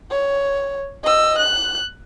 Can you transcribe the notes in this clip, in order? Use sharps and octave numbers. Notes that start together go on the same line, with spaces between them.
C#5
D#5 E6
F#6